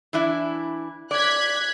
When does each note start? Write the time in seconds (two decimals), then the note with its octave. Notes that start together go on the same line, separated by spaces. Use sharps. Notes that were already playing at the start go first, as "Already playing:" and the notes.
0.13 E3 D4 E4
1.11 D5 F#6 G#6 B6